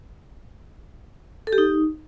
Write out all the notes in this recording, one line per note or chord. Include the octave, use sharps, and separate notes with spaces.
A4
G4
D#4